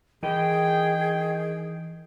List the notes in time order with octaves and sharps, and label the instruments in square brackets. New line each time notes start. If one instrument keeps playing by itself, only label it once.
[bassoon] D#3 [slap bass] E3 [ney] G#4 [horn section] G5